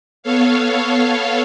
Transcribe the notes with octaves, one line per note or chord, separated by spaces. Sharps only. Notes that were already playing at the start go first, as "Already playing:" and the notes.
B3 A4 C#5 F5